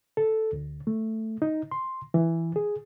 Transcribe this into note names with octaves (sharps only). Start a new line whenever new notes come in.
A4
D2
A3
D#4
C6
E3
G#4